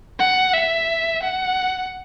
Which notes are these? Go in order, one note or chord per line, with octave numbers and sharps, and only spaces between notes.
F#5
E5
F#5